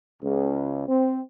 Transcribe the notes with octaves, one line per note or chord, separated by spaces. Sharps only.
C#2
C4